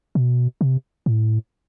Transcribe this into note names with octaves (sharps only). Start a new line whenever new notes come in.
B2
C3
A2